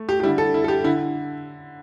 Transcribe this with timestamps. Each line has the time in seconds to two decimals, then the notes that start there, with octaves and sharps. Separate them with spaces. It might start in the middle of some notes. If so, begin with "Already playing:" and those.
Already playing: A3
0.09 G4
0.20 G4
0.23 G3 E4
0.26 D3
0.38 A4
0.54 E4
0.64 A4
0.68 G4
0.84 D3 E4